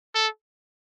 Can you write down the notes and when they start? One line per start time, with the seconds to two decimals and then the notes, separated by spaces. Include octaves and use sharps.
0.15 A4